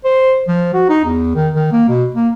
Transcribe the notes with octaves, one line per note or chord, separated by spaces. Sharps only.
C5
F3
F#4
D#4
E2
D#3
D#3
A#3
B2
A#3